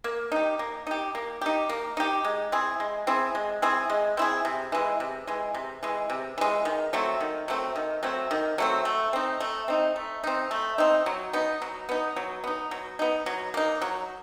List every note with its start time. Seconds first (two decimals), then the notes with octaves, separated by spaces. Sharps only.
0.04 A#3
0.32 D#4 G4
0.59 A#3
0.87 D#4 G4
1.15 A#3
1.41 D#4 G4
1.69 A#3
1.97 D#4 G4
2.25 G#3
2.52 C4 E4 G#4
2.80 G#3
3.07 C4 E4 G#4
3.35 G#3
3.62 C4 E4 G#4
3.90 G#3
4.17 C4 E4 G#4
4.45 C3
4.72 E3 G#3
5.00 C3
5.27 E3 G#3
5.54 C3
5.83 E3 G#3
6.10 C3
6.38 E3 G#3
6.65 D#3
6.93 F#3 A3 C4
7.20 D#3
7.48 F#3 A3 C4
7.76 D#3
8.03 F#3 A3 C4
8.31 D#3
8.58 F#3 A3 C4
8.85 A3
9.13 C4 D#4
9.40 A3
9.68 C4 D#4
9.96 A3
10.24 C4 D#4
10.51 A3
10.78 C4 D#4
11.06 F#3
11.33 B3 D#4
11.62 F#3
11.89 B3 D#4
12.16 F#3
12.44 B3 D#4
12.71 F#3
12.99 B3 D#4
13.26 F#3
13.54 A#3 D#4
13.82 F#3